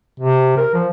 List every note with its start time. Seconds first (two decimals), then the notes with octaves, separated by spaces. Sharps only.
0.20 C3
0.57 A#4
0.74 F3